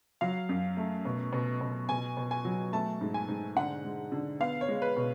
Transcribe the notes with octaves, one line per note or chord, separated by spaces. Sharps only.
F#3 F5
F#2
A3
B2
B2
B2
B2 G#5
B2
G#5
F#3
A3 A5
G#2
G#5
G#2
D3 F#5
G#3
D3
B3 F5
C#5
G#3
B4
B2